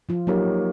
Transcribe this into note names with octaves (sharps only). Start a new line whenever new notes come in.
F3 F4
F#3 A#3 D#4 F#4 G4 A#4 C#5